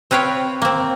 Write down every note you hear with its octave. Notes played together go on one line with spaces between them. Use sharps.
C4 B4 C#5 F5 G5
A#3 C4